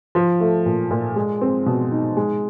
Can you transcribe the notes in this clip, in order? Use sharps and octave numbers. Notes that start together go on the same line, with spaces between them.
F3
A3
A#2
A#2
G#3
C4
B2
D#4
G#3